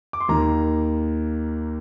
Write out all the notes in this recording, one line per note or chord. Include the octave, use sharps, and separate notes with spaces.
D6
C6
D#2 D#3 A#3 A#5